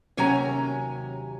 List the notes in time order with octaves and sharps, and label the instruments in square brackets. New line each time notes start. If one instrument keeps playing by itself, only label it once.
[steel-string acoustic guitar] D#2 C3 F#3 C#4 G#5 A#5